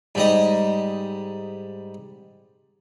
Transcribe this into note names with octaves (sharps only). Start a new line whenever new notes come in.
G#2 G3 D#5